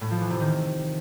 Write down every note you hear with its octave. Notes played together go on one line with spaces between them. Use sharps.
A2
F3
E3
C3
D#3